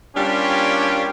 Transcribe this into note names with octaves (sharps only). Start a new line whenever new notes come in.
G3 A#3 C#4 D4 F4 G4